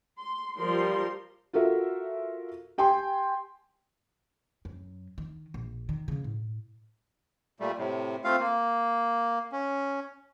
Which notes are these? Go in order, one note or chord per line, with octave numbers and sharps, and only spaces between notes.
C6
F3 G3 A#4 C6
F4 F#4 A4 A#4 E5
G4 G5 G#5 C6
F#2
D#3
A#1
D#3
C#3 B3
A2
A#2 G3 A3
A2 C3
A3 C4 F4 F5
A#3
C#4